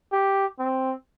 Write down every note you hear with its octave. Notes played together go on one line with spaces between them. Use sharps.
G4
C4